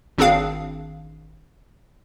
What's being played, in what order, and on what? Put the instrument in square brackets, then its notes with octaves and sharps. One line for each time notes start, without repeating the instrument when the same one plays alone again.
[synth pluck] G#1 C4 D4 G#4 F5